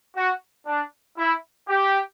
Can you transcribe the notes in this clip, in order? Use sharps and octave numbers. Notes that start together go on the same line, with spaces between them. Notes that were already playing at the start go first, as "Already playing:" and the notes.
F#4
D4
E4
G4